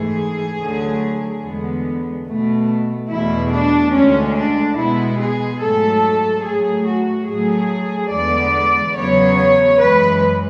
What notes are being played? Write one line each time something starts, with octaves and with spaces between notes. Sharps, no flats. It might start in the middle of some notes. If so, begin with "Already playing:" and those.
Already playing: G#2 E3 A3 G#4
D2 D3 F#3 A3
E2 D3 G#3 B3
B2 A3
E2 B2 A3 E4
D4
D2 D3 G#3 C#4
D4
B2 G#3 B3 E4
G#4
G#2 F#3 A3 A4
A2 F#3 A3 G#4
F#4
A2 F#3 A3 G#4
E2 D3 G#3 B3 D5
E2 C#3 F#3 B3 C#5
F#2 E3 G#3 B4